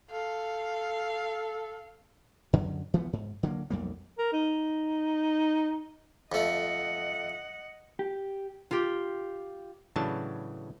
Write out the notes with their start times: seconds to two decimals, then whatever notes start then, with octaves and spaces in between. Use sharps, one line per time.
0.11 A4 F5
2.53 F#2 D3 F#3
2.94 E3 F3 A#3 B3
3.13 G#2
3.43 D3 F#3 G#3 A#3
3.70 B1 F2 G3 A#3
4.18 A#4
4.33 D#4
6.32 F2 A3 D#5 F#5
7.99 G4
8.71 F4 G4
9.96 A2 C#3 E3 F#3 D4 A5